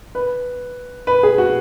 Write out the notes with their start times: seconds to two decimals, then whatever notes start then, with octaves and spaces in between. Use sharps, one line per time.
0.15 B4
1.07 B4
1.23 G#4
1.38 F#4